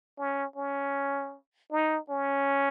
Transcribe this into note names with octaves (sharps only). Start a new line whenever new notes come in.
C#4
C#4
D#4
C#4